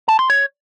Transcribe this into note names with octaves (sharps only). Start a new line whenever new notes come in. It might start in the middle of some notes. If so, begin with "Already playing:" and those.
A5
C6
C#5